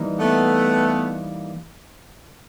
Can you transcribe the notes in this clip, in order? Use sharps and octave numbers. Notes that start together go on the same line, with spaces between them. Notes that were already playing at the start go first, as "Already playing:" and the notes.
Already playing: E3 G3 A#3 D#4
A3 B3